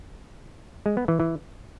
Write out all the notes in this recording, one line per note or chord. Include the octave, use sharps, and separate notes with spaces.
G#3
B3
E3
E3